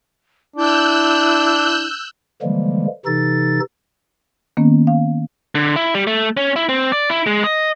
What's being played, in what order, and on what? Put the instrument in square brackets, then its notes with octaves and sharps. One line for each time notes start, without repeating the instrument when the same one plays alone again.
[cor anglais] D4 [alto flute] E4 [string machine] E6 F#6 G6
[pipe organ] D3 E3 F3 G3 G#3 A#3
C3 E3 D#4 A4 A6
[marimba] D#3 A#3 B3 C#4
F5
[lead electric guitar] D3
E4
G3
A3
C#4
E4
C4
D5
E4
G#3
D#5